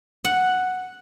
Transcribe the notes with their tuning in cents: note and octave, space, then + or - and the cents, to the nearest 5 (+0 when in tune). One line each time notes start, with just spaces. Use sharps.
F#5 +0